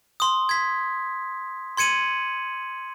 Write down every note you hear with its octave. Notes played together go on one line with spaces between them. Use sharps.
C6 D#6
G#6 B6
C6 G#6 C#7 D#7 F#7